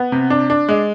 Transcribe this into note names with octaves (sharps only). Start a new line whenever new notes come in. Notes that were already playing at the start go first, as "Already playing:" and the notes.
Already playing: B3
C3
D4
D4
G#3